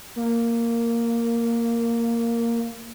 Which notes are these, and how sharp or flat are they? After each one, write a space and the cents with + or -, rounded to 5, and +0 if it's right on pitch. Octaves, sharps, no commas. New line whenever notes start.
A#3 -5